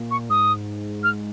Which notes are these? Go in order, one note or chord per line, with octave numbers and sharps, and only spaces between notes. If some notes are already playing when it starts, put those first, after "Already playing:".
Already playing: A#2
C#6
G#2 D#6
F6